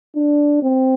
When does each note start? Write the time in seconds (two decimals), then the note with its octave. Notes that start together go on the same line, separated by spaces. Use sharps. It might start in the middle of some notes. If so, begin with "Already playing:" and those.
0.16 D4
0.63 C4